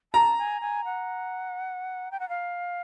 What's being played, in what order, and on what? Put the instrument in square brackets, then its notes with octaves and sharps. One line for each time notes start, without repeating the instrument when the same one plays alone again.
[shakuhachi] A5 [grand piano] A#5
[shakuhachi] G#5
G#5
F#5
G5
F#5
F5